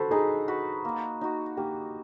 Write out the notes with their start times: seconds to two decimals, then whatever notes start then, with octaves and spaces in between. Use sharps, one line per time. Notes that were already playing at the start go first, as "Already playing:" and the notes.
Already playing: F#4 A4 B4 C5
0.11 D#4 G#4
0.48 F#4 B4
0.85 A#3
1.21 D#4 F#4
1.57 A#3 G4